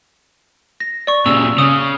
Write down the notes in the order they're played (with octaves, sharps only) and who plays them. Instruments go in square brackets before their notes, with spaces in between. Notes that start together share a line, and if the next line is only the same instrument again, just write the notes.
[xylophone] A#6
D5 C#6
[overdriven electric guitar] A#2 C#3 [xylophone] E6
[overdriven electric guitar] C#3 [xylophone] D#6